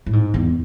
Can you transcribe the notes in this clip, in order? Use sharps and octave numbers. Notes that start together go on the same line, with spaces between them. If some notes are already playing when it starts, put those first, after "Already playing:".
A2
G#2
E2